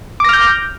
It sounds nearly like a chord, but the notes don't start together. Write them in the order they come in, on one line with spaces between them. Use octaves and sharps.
D6 A#6 F6 G6